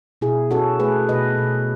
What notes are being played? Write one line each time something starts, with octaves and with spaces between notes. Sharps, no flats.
B2 E4 G#4
C#4 F#4 A4
A3 G#4 B4
B2 B4 D#5
B2